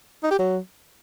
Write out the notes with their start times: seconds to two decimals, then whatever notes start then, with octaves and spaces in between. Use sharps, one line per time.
0.23 D#4
0.31 G4
0.39 F#3